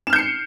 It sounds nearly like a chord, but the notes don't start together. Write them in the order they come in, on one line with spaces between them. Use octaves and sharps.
E7 F6 G6 C#7 C7